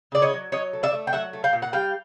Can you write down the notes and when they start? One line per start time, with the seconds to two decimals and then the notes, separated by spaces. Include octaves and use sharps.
0.12 C#3 D5
0.22 C#5 D#5
0.33 F#3
0.52 F#3 C#5 D#5
0.73 A3
0.83 D5 E5
0.93 A3
1.07 G5
1.13 F#3 E5 F#5
1.33 A3
1.44 F5 G5
1.53 A#2
1.62 F#5
1.73 G3 F5 G5